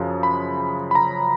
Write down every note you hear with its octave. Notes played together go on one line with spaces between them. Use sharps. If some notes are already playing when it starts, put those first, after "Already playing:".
Already playing: F#2 C#3 F3
B5
B5
A#5